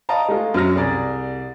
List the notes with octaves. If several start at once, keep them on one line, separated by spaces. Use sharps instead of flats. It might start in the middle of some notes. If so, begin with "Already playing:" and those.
D5 D#5 F5 A5 A#5
G#3 A3 F4 G#4
F#2 F#3 F6 A#6
C2 G#4 D5 A#5 A6